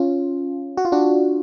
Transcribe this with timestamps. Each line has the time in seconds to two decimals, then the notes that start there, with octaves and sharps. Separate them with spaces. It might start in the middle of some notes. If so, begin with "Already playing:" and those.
Already playing: C#4 F4
0.77 F#4
0.85 F4
0.92 D4 F#4